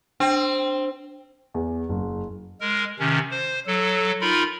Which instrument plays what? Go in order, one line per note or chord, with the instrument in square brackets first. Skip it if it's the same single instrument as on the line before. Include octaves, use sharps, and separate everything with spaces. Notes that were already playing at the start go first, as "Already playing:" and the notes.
[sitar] C4 [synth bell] D4
[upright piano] E2
F#1
[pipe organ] G#3 A#4
C3 D#3 C#4
C5
F#3 A4
D#4 F4 A#4 B5